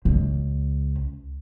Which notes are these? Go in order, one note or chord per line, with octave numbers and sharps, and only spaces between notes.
C#2